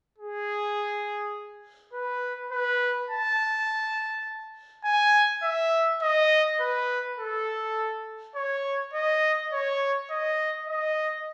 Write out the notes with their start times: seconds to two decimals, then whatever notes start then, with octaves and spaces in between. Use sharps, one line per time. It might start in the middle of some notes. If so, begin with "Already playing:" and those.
0.18 G#4
1.93 B4
2.51 B4
3.10 A5
4.84 G#5
5.43 E5
6.02 D#5
6.60 B4
7.18 A4
8.35 C#5
8.93 D#5
9.52 C#5
10.10 D#5
10.68 D#5